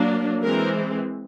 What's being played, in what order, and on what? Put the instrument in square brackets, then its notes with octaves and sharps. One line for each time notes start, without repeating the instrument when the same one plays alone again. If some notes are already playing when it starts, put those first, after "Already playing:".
Already playing: [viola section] F#3 A#3 D4
E3 G#3 C4 A#4